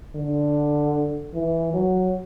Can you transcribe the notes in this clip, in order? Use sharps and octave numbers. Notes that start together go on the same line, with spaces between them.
D3
E3
F#3